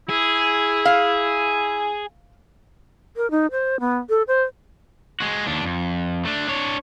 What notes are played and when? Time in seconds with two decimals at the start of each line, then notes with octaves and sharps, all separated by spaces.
0.09 E4 G#4
0.85 F5
3.17 A#4
3.31 D#4
3.52 C5
3.80 B3
4.10 A4
4.28 C5
5.20 G#3 F#4
5.46 D#2 D4
5.63 F2
6.25 A3 D4
6.48 D4 C#5